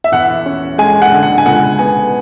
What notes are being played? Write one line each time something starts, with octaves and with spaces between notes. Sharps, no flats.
E5
E2 F#5
C#4
G#3 G#5
F#5
D3
F#5
G#5
C#2 F#5
B3 G#5